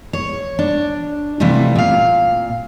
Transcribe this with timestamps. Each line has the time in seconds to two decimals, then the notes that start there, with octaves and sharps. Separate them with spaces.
0.13 C#5
0.59 D4
1.40 C3 E3 F3 G3 A3
1.75 A#2 F5